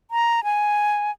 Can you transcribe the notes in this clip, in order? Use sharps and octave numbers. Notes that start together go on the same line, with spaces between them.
A#5
G#5